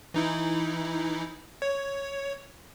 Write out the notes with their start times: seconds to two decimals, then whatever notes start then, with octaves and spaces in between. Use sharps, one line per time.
0.14 E3 D#4 E4
1.62 C#5